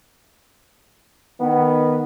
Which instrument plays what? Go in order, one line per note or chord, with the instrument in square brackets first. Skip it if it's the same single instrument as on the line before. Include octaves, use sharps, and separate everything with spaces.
[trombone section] D#3 B3